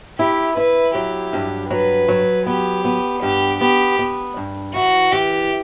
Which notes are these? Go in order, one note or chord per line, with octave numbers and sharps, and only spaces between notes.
E4 G4
E4 B4
F#3 G4
G2
F#3 B4
F#3
B3 G4
B3
G2 G4
B3 G4
B3
G2
E3 F#4
E3 G4